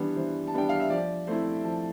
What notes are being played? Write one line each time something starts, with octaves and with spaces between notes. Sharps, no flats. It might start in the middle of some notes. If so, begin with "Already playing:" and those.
Already playing: E3 G3 B3 D4
E3 C5
A5
G3 B3 D4 G5
F5
E5
F3 D5
A3 C4 E4 C5
F3 A5